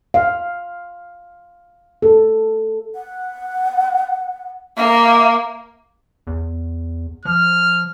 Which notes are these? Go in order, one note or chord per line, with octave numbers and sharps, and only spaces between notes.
F5
A4
F#5
A#3 E5
E2
F3 F6